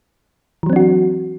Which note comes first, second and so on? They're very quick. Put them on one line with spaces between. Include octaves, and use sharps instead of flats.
E3 F#3 C4 D4 F#4